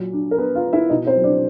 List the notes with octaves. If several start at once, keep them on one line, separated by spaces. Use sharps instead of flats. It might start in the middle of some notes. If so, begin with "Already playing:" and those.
Already playing: A#2 F#3
D4
A#4
B3 B4
F4 F5
B3
E4 E5
B2 D#4 D#5
C4 C5
F#3
D4 D5